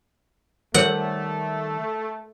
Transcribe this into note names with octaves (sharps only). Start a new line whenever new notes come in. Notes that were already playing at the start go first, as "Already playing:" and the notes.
D#3 G3 A3 A#4 C5 C#5 F#5